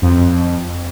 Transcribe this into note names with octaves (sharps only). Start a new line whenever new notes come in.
F2